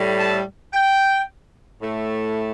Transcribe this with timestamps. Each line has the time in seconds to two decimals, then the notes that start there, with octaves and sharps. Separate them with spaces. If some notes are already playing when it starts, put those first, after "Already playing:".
Already playing: A2 G3
0.19 A5
0.74 G5
1.81 A2 A3